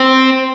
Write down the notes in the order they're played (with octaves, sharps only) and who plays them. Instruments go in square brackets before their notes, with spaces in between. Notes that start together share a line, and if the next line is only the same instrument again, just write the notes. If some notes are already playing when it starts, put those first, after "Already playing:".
Already playing: [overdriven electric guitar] C4